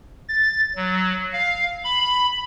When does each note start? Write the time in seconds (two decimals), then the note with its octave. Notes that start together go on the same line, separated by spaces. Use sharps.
0.29 A6
0.76 F#3
1.33 F5
1.84 B5